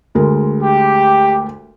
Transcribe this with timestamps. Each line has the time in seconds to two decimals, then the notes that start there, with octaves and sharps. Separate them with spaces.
0.15 D2 G#3 A#4
0.63 G4